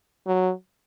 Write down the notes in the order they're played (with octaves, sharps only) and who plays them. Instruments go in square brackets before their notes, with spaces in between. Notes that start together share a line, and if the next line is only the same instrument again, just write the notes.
[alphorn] F#3